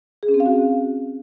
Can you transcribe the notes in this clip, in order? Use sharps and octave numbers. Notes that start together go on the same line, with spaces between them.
G#4
C#4
C4
F5
F#4